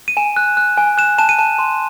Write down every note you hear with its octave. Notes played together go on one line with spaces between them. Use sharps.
D#7
G#5 E7
F#6
F#6
G#5
F#6 E7
A5 E7
D#7
A5 E7
C6